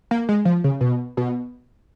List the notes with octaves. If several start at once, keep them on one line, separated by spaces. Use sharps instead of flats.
A#3
G#3
F3
C#3
B2
B2